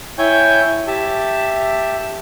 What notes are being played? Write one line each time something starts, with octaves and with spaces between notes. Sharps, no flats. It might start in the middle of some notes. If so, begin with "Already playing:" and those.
E4 C#5 G5 G#5 G6
G4 E5 A5